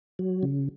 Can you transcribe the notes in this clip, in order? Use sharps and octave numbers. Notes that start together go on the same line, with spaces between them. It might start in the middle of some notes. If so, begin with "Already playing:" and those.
F#3
C#3